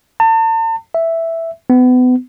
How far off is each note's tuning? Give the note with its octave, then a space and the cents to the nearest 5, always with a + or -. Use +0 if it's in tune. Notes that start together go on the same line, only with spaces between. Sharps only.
A5 +40
E5 +0
B3 +30